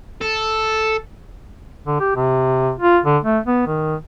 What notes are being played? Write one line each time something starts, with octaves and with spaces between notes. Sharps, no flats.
A4
D3
G4
C3
F4
D3
A3
B3
D#3